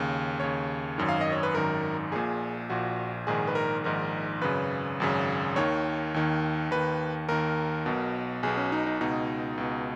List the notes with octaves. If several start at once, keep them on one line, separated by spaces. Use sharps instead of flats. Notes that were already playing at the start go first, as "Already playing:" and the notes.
Already playing: D#2 C#3
D#2 C#3 C#5
G#1 F#2 D#3
F5
D#5
C#5
B4
G#1 F#2 D#3 A#4
A#1 A#2 G#4
A#1 A#2 F#4
A#1 G#2 D#3 G#4
B4
A#4
A#1 G#2 D#3 A#4
G#1 F#2 C#3 B4
G#1 F#2 C#3
D#2 D#3 C#5
D#2 D#3
D#2 D#3 B4
D#2 D#3 A#4
B1 B2
B1 B2 G#4
C#4
D#4
D#4
C#2 B2 D#4
C#2 B2